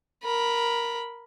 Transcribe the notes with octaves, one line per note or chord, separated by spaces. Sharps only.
A#4 B5